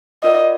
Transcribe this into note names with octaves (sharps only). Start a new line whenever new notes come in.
F4 A#4 D5 D#5 F#5